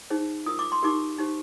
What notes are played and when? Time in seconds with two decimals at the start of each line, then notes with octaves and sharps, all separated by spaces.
0.10 D#4 G#4 C5
0.46 F4 A#4 D#6
0.59 D6
0.72 C6
0.83 D#4 G4 A#4 D6
1.18 D#4 G4 C5